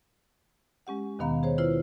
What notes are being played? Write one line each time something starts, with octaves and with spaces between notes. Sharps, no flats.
G#3 C#4 G4 F#5
D#2 B2 D#3 B3 F5 A#5
G#4 C5 C#5
E4 F4 B4 C5